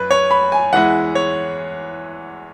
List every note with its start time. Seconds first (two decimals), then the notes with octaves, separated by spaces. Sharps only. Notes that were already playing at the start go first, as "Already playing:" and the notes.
Already playing: F#2 B4
0.11 C#5
0.31 B5
0.52 G#5
0.73 E2 E3 G#3 E4 F#5
1.15 C#5